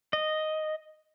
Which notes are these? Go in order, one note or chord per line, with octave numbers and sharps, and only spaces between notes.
D#5